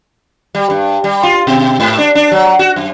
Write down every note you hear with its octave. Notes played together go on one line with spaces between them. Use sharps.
G3
G2
G3
F4
B2
G#2
D4
D4
F#3
F#4
F#2